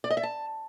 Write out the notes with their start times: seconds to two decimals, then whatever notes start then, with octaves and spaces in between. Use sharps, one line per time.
0.04 D5
0.10 D#5
0.17 E5
0.23 A5